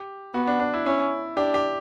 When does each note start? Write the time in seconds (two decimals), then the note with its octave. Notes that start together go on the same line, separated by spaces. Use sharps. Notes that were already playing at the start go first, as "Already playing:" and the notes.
Already playing: G4
0.34 B3 F#4
0.47 D4
0.60 D4
0.74 E4
0.86 C#4 E4
1.37 D4 G4
1.54 G4